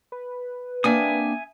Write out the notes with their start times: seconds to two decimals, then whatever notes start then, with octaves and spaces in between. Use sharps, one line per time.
0.12 B4
0.84 A#3 C4 D4 E5 G#5 D#6